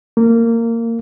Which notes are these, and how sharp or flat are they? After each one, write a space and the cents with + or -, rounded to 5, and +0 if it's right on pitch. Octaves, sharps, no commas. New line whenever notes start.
A#3 -20